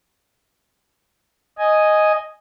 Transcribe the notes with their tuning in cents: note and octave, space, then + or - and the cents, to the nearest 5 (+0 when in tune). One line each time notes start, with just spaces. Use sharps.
D#5 +0 G#5 +0